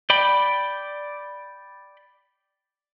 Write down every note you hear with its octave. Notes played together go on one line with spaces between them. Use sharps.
D5 G5 B5